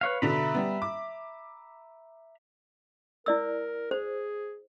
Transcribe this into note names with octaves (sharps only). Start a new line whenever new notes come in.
B4 C#5 F5
B2 D3 E5 A#5 B5
G3 B3
D6
E4 A#4 D5 E6
G#4 C5